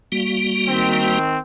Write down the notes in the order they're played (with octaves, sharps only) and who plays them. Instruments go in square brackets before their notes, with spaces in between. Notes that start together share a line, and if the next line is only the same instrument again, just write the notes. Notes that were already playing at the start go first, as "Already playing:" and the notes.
[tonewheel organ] G3 A#3 F#4
[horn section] D#3 C4